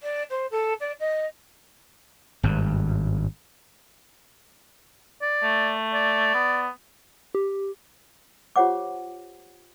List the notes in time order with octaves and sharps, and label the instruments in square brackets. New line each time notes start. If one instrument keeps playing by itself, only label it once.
[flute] D5
C5
A4
D5
D#5
[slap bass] G#1 G2
[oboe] D5
[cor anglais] A3
[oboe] D5
[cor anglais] B3
[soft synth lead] G4
[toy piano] F4 G4 C5 C#5 F#5 D6